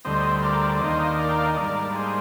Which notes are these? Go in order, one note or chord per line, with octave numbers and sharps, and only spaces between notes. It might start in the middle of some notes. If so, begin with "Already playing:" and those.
D2 D3 G3 C4 C5 D#5
A#4 D5
D5
D#2 D#3 A#3 D4 C5 D#5
F5
D#5
A#4 D5
G5
F5
D#5
G#2 G3 A#3 D4 A#4 D5
G#4 C5